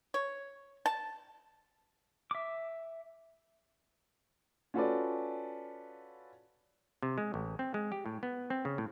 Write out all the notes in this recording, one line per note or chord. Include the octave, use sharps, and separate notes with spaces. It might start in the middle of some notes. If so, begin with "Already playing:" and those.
C#5
A5
E5 D6
C#4 F4 F#4 A4 B4 D5
C3
G#3
A1
C4
G#3
G4
A2
B3
C4
C#3
A2